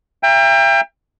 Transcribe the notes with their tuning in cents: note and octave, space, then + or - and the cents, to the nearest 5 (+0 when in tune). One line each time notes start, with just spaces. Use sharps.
E5 +35 G5 +30 A#5 +5